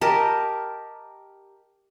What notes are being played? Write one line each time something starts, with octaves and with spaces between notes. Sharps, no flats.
G4 A#4 D#5 A5